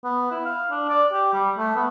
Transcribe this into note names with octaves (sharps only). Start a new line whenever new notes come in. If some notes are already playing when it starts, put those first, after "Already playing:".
B3
E4
F5
D4
D5
G4
G3
A3
B3